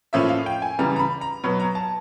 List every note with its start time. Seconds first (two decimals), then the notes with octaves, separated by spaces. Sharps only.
0.13 A2 F3 A#3 C#4 E5
0.29 F5
0.46 G5
0.62 G#5
0.79 C#3 E3 G3 A#5
0.96 A#5
0.99 B5
1.21 A#5
1.44 B2 F#3 B3 B5
1.60 A#5
1.75 A5